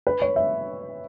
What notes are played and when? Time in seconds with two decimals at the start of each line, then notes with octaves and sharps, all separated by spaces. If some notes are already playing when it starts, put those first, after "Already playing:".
0.07 B4
0.22 C#5
0.36 E5